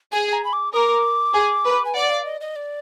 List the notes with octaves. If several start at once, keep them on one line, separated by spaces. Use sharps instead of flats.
G#4 G#5
A#5
B5
D6
A#4 D6 D#6
G#4
B4
G#5
D5 F#5
F5
D#5
D#5
D5